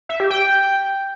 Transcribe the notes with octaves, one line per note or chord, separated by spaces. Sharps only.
E5
G4
G5